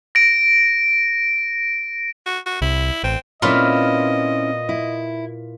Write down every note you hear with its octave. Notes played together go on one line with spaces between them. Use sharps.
A#6 D7
F#4
F#4
C2 E4
A1 C4
A#2 C4 C#4 E4 F4 B4 D#5
E4